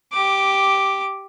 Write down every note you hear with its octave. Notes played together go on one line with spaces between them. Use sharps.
G4 D6